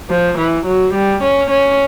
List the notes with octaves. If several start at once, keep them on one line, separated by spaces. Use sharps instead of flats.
F3
E3
F#3
G3
C#4
C#4